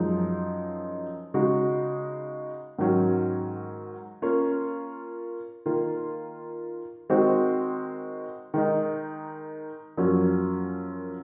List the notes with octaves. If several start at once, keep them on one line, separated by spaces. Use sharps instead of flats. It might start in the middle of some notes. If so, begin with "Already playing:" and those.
Already playing: F#2 F3 G#3 D#4
C#3 G#3 D#4 F#4
G#2 D#3 F#3 C#4
A#3 C#4 F4
D#3 A#3 F4
D#3 G#3 C4 F#4 C5
D#3 G#3 D#4
F#2 F3 A#3 C#4 F#4